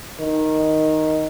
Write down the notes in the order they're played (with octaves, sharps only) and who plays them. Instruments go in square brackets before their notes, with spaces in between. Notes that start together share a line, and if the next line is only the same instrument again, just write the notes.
[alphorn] D#3